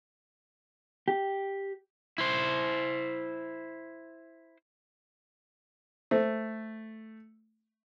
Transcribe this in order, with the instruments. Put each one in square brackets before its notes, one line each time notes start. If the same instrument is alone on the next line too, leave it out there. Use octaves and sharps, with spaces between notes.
[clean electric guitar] G4
[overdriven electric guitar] E4 C5
[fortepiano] A3 [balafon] C5